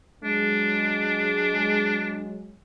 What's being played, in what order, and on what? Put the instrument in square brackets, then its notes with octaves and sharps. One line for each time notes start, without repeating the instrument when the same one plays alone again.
[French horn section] F#3 G#3 [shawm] D4